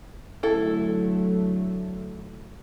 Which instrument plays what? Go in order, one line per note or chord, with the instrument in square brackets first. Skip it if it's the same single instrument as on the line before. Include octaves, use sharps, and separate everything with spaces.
[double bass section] D3 F#3 A3 [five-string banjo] E4 A4